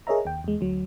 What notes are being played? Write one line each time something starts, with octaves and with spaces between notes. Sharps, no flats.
G#4 A#4 C#5 D#5 E5 A#5
D#2 G5
E2 G#3
D2 F#3